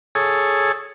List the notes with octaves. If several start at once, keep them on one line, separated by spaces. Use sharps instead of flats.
G#4 A4 C#5